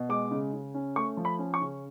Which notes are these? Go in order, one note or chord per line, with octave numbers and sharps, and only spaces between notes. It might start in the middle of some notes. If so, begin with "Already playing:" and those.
Already playing: B2
G#3 D6
C#3
C#3
C#4
A3 C#6
F3
B5
C#4
C#6
C#3